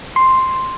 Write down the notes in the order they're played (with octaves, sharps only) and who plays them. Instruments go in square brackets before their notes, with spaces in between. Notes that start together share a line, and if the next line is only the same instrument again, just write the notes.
[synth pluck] C6